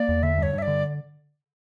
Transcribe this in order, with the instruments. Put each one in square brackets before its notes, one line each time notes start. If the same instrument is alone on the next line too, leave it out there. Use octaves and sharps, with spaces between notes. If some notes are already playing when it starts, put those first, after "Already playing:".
Already playing: [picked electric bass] A#3 [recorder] D5
[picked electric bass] E2
[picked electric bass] D3 [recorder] E5
[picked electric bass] G2 [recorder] C#5
[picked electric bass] G2
[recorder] E5
D5
[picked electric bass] D3